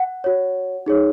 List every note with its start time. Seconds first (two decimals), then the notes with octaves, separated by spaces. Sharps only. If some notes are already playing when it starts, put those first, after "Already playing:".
Already playing: F#5
0.24 F#4 C#5
0.86 D#4 G#4 C#5